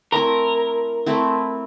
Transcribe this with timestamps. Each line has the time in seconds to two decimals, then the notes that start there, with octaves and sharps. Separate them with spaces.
0.12 A3 C4 E4 A#4
1.06 A3 C4 E4